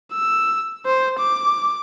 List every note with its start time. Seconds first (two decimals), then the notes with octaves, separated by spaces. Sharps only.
0.13 E6
0.86 C5
1.19 D6